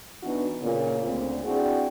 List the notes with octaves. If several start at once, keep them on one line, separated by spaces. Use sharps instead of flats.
E3 B3 D4 D#4 F#4
A#2 C#3
D2 C4
C4 D4 E4 F#4 G#4